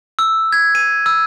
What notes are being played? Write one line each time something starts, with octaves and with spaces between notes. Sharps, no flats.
E6
G#6
D#7
E6